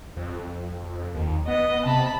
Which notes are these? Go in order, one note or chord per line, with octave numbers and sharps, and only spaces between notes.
F2
D#2
B3 D#5
C3 A5 B5